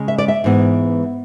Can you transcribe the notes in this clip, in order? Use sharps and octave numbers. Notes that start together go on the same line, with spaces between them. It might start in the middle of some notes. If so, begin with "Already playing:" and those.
Already playing: C#3 G#3 C#4
E5
D5
E5
G#2 E3 B3